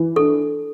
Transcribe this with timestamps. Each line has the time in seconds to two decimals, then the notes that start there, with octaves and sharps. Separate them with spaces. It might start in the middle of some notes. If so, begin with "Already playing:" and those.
Already playing: E3
0.16 D4 A4